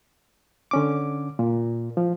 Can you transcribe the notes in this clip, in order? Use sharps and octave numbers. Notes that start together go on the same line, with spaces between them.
D3 C#4 D6
A#2
F3